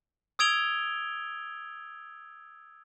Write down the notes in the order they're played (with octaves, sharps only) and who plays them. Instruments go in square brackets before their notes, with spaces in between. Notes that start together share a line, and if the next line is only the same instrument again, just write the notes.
[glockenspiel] D#6 E6 G#6 D7 F7 G7